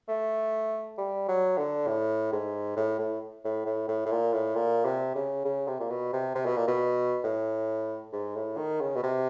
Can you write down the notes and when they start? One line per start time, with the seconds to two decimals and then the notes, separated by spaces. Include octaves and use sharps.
0.09 A3
0.98 G3
1.28 F#3
1.57 D3
1.87 A2
2.32 G#2
2.77 A2
2.99 A2
3.45 A2
3.66 A2
3.88 A2
4.06 A2
4.12 A#2
4.33 A2
4.55 A#2
4.85 C3
5.15 C#3
5.45 C#3
5.68 C3
5.80 A#2
5.90 B2
6.13 C3
6.35 C3
6.46 B2
6.57 A#2
6.68 B2
7.24 A2
8.13 G#2
8.36 A2
8.57 D#3
8.81 C#3
8.96 B2
9.03 C3